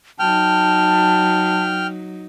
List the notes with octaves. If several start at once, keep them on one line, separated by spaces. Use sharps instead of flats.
F#3 D#4 G5 A5 F6